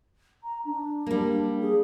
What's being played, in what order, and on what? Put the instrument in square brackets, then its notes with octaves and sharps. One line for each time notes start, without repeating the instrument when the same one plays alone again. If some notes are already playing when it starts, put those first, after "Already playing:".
[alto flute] A#5
D4
[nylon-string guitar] G3 A#3
[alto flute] G#4